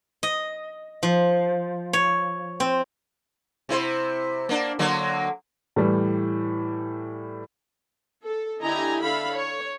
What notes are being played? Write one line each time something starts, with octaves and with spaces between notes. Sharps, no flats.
D#5
F3
C#5
C4
C3 E4 C5
A#3 D4
D3 F#3 A#3
A2 E3 G3
A4
D3 E4 G4 D#5 G#5 A#5
D3 A4 E5 F5 B5
C#5